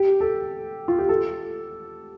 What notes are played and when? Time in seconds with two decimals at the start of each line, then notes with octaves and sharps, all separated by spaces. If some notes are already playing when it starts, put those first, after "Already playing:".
Already playing: G4
0.21 A4
0.88 F4
0.98 G4
1.09 A4